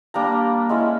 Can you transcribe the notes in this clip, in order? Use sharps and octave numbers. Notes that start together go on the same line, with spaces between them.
G3 A#3 D4 A#5
G#3 C#4 E4